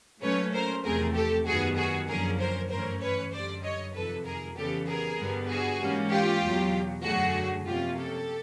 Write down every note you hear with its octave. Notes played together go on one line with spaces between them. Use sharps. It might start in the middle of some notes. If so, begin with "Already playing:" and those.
A#2 F#3 A3 C#4 B4 C#5
A#4 C5
E2 C3 F3 A3 C4 G#4 A#4
G4 A4
F#2 D#3 G3 B3 F#4 G#4
F#4 G#4
F#2 D3 F3 A#3 C#4 G#4 A#4
A#4 C5
G2 E3 A3 C#4 A#4 C5
B4 C#5
F#2 D3 G3 C5 D5
C#5 D#5
F2 C3 D#3 A4 B4
G#4 A#4
C#3 E3 G3 B3 G4 A4
G#4 A#4
G2 D3 G3 B3
F#4 G#4
G#2 E3 G3 A#3 C#4
F4 G4
E2 B2 F#3
F#2 D3 F#3 A3 F#4 G#4
C3 F3 A#3 C#4 F4 G4
G4 A4